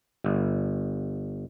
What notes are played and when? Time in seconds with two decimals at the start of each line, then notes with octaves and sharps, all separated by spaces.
0.24 G1